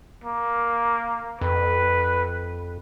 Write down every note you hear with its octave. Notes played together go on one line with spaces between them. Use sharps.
A#3
F2 B4